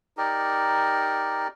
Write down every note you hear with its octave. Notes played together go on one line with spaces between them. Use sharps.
D#4 G4 A#4 D5